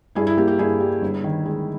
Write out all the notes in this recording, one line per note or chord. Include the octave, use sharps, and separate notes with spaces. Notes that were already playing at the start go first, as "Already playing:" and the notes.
G2 E4 G#4
E4
A#3 G4
G4
G2 E4 G#4
G3
G1
D#3
G#3